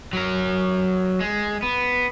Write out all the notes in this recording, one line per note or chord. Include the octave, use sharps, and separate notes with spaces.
F#3 A#4
G#3
B3